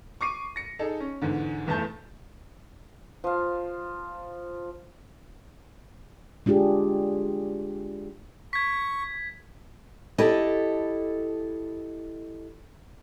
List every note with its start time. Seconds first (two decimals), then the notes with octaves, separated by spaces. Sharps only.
0.21 C#6 D6 C7 D#7
0.56 A#6 C#7
0.79 D#4 G#4 A4 A5
1.00 C#4
1.22 E2 G#2 D3
1.67 F1 E2 A3 A5 G6
3.24 F3 F5
6.46 G#3 D4 F4 G4 G#4
8.53 C#6 G#6 B6
10.18 E4 G4 A4 D#5